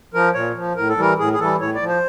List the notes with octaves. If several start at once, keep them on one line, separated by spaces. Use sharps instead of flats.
F3 A#4
A#2 C#5
F3
A2 A#4
A4
E3 G3 A#4
A2 G#4
G#4
E3 G3 A4
A2 C#5
D5
F3
C5